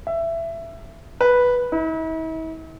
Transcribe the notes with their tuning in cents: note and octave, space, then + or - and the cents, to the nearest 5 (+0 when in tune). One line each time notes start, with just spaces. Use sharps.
E5 +15
B4 -5
E4 -45